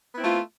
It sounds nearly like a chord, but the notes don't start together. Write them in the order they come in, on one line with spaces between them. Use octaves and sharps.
B3 E4 C4 A3 F4